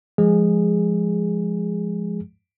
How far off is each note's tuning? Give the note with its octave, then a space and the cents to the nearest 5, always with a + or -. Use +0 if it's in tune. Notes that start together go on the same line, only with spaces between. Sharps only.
F3 -10 G#3 +0 G#4 -10